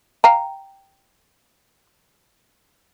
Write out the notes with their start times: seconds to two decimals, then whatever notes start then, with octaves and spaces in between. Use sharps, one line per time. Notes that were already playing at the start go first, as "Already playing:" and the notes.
0.24 F5 G5 A#5